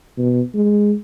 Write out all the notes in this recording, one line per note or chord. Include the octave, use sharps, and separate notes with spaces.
B2
G#3